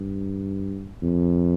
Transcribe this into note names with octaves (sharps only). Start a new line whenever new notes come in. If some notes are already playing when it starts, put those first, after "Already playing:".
Already playing: G2
F2